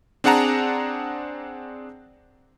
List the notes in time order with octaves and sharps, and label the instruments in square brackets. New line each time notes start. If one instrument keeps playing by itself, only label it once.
[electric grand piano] C4 D4 G#4 F#5 A5 A#5